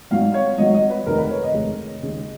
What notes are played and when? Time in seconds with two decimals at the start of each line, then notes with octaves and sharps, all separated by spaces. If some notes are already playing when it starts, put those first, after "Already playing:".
0.11 G#1 G#2 F#3 F5
0.34 C#5
0.58 G#1 G#2 F#3 D#5
0.74 D#5
0.90 B4
1.06 F1 D#2 D#3 G#3 A#4
1.18 B4
1.30 C#5
1.43 D#5
1.54 F1 D#2 D#3 G#3
2.03 D#2 C#3 G#3